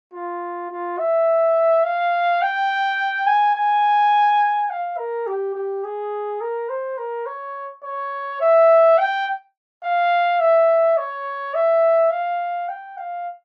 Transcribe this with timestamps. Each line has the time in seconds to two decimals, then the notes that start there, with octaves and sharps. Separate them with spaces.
0.13 F4
0.71 F4
0.99 E5
1.84 F5
2.41 G5
3.26 G#5
3.55 G#5
4.70 F5
4.98 A#4
5.27 G4
5.55 G4
5.84 G#4
6.41 A#4
6.69 C5
6.97 A#4
7.26 C#5
7.83 C#5
8.41 E5
8.98 G5
9.83 F5
10.40 E5
10.97 C#5
11.54 E5
12.11 F5
12.68 G5
12.97 F5